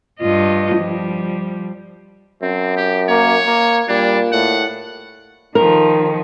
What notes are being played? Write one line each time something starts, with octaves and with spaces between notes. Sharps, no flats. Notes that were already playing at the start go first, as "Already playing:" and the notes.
G2 F4 D#5
F3 G3
F#2 C4
G4
A#3 C#5
A#3
A#2 G3 D4
A2 F#5
D#3 F3 A#4